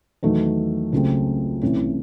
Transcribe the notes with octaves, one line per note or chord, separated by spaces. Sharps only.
E2 D#3 F#3 A3
C#2 C#3 F#3 A3 C4
C2 C3 E3 A3 C#4